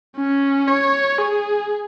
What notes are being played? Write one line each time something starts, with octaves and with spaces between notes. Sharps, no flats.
C#4
C#5
G#4